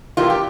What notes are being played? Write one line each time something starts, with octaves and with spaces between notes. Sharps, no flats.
C3 E3 G3 A#3 F4
G4